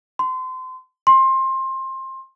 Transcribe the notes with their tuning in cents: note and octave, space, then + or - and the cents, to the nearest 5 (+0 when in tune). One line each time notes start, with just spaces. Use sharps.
C6 -30
C6 +20